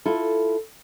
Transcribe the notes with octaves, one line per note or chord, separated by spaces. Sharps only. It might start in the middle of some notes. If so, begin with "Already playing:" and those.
E4 F4 A4